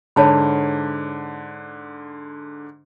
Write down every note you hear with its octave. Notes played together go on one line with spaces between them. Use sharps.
G#2 D3 C#5 A5 B5